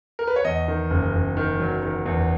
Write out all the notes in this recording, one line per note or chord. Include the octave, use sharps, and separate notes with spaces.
A#4
B4
C#5
E2 D#5
D#3
F#1
F#1
D#3
F#3
D#3
E2